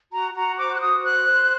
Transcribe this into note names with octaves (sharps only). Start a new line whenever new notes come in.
F#4 A#5
F#4 A#5
C5 D6
F#6
F#4 D#6
C5 F#6
C5